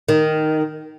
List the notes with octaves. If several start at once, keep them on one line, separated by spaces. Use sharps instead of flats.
D#3